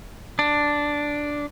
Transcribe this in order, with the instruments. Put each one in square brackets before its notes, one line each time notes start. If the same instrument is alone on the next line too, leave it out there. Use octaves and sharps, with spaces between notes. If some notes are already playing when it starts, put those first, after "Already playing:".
[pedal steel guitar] D4